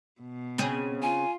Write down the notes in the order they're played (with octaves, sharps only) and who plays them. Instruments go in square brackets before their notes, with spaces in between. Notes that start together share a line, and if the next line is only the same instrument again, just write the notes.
[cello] B2
[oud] C#3 C4 G#4
[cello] F4 [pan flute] G#5